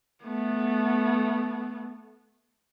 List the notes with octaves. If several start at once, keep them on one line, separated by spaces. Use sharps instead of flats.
A3 B3